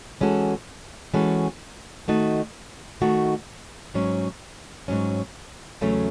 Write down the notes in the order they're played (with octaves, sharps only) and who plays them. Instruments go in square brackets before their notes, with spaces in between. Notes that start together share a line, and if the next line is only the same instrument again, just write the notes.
[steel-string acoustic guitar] E3 G#3 C#4 F#4 A4
E3 G#3 C#4 F#4 A4
D#3 A3 D#4 F#4
D#3 A3 D#4 F#4
G#2 F#3 C#4
G#2 F#3 C#4
E2 C#3 F#3 A3 C#4